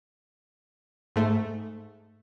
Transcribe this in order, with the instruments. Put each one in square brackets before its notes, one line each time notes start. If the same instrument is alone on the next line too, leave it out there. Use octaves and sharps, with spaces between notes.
[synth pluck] G#2 A3